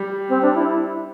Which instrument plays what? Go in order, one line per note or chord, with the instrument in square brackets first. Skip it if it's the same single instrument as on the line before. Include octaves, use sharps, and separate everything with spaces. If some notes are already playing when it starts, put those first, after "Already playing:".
Already playing: [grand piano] G3
[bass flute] C4
D4
E4